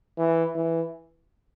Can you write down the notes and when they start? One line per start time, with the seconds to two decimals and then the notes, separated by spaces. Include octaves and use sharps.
0.18 E3
0.56 E3